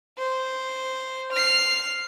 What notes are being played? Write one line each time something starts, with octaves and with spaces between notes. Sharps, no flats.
C5
F6 C7